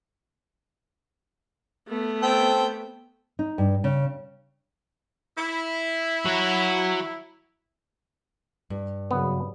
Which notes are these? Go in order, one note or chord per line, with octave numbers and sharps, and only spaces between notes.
A3 B3
C4 A4 G5
D#4
G2
C#3
E4
F#3 F#4
G2
F#2 C#3 B3